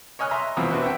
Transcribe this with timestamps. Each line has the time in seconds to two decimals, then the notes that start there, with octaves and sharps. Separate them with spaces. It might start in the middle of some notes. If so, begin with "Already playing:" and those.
0.19 C#5 D#5 G#5 F6 F#6
0.31 E5 A#5 C6
0.57 E2 B2 C4 E4 F4 D#6
0.69 D4 F#4 B4 C5
0.82 E5 F#5 G5